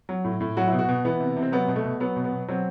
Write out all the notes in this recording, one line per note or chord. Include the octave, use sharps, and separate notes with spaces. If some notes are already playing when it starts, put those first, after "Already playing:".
F#3
A2
A2
F#3 F#4
B2 E4
F#4
B2
E3 B3
C3
C3
C4
F#3 B3
B2
A3
B2
F#3 B3
B2
B3
B2
F#3 C4